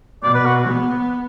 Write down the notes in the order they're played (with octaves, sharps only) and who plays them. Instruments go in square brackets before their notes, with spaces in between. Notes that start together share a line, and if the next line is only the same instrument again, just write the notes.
[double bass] B2 [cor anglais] D5
[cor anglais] B4
F#4
[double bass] B3